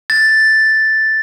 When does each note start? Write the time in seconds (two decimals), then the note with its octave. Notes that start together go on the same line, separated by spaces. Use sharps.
0.10 A6